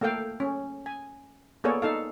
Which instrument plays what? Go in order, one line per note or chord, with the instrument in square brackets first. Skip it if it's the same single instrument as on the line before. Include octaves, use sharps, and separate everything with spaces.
[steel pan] A3 A#3 A4 F5 G5
C#4
G#5
A#3 B3 G#4 A4 C#5 D5
D#4 A4 F5